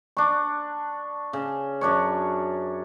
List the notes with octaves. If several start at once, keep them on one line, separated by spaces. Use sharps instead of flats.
D4 C#6
C#3
F#2 D4 C#5